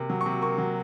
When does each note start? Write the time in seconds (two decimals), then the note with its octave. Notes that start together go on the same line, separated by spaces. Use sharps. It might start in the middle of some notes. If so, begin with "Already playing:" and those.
Already playing: C3 A#3
0.10 F#3
0.21 C#6
0.26 C3
0.42 A#3 C#6
0.58 F#3